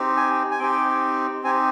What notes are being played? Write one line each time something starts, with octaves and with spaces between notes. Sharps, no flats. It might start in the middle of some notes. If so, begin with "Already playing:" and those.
Already playing: C4 D#4 G4
G#5
G#5
C4 D#4 G4 G5
C4 D#4 G4 G#5